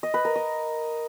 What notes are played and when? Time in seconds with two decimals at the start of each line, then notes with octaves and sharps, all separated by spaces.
0.03 D#5
0.14 B4
0.25 A#4
0.36 D#5